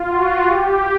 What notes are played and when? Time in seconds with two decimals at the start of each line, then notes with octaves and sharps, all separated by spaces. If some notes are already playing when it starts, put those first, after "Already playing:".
Already playing: F4
0.10 F#4
0.46 G4